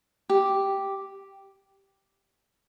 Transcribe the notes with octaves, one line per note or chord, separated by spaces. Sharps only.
G4